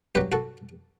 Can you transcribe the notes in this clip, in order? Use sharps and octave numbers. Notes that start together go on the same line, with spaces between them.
G2 F#3 G4 B4
F#4 A4